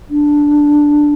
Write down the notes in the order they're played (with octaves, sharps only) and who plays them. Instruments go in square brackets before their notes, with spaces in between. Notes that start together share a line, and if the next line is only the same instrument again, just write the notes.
[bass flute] D4